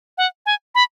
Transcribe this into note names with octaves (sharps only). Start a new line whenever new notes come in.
F#5
G#5
B5